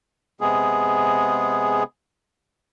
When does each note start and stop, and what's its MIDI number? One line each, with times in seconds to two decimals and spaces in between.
0.41 1.83 48
0.41 1.83 56
0.41 1.83 59
0.41 1.83 68